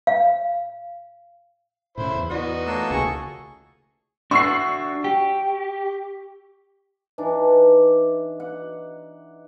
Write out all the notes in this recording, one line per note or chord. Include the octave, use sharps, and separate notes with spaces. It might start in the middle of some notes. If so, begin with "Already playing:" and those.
F5
A2 C#3 E4 C5 B5
E2
B3 D#4 E4 F#4 D5
E3 A3 A#3 A4 E6
C#2 C3 G#4 A4 C#6
D4 F#4 C#6 E6 C7
G4
E3 D4 D#4
F#5